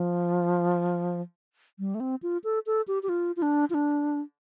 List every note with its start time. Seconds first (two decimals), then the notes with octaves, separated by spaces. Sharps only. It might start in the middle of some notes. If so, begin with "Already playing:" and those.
Already playing: F3
1.79 G3
1.95 A3
2.00 C4
2.23 F4
2.44 A4
2.66 A4
2.88 G4
3.03 G4
3.09 F4
3.37 F4
3.42 D4
3.70 F4
3.74 D4